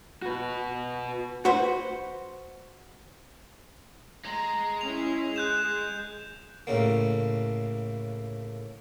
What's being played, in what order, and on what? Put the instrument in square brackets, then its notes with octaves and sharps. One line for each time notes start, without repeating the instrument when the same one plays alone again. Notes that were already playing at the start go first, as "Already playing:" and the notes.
[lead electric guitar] F#4 B4
[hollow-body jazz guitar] F#4 B4 C5
[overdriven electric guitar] G#3 [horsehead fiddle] A#5
[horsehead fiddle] C#4 E4 [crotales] F7
[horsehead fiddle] G#4 [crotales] F#6 G6 E7
[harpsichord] A2 C#3 A#3